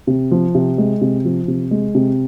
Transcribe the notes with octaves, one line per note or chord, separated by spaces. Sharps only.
C3
F3
C3
G#3
C3
F3
C3
G#3
C3